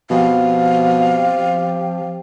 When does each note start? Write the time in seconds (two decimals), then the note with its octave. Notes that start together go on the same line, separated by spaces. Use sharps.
0.11 B2 F3 C4 G4 F5